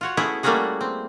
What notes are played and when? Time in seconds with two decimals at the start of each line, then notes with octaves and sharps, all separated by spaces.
0.01 F4 F#4 C#5
0.17 A3 B3 C#4 E4 G#4
0.43 G3 A3 A#3 C#4 F#4 G#4
0.81 C4